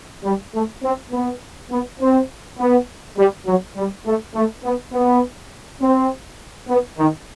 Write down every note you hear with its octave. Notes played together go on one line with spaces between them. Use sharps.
G3
A3
C4
B3
B3
C4
B3
G3
F#3
G3
A3
A3
B3
B3
C4
B3
D#3